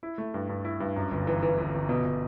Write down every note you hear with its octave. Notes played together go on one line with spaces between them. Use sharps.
E4
A3
G2
G2
E4
G2
F#2
G1
E3
E3
G1
G1
B2
B2